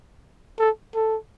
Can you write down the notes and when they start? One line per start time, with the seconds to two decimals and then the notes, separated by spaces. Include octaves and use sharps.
0.59 A4
0.95 A4